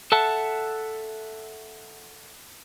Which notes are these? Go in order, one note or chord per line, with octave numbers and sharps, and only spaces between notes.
A4 E5 F#5 A5